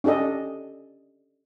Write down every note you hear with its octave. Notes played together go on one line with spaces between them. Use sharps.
C#4 D4 G4 A4 D#5